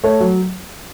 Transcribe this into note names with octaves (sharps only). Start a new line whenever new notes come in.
A3 A4 C#5
F#3